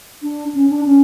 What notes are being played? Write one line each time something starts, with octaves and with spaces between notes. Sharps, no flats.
D4
C#4
D4
C#4